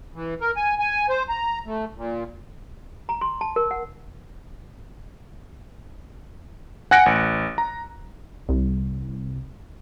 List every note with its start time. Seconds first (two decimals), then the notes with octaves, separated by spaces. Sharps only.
0.14 E3
0.41 A#4
0.56 G#5
0.79 G#5
1.09 C5
1.29 A#5
1.65 A3
1.96 A#2
3.09 A#5
3.21 C6
3.41 A5
3.56 A#4
3.71 F#5
6.91 F#5 G#5 F#6 A#6 C#7 D7
7.06 A1
7.58 A#5
8.49 C2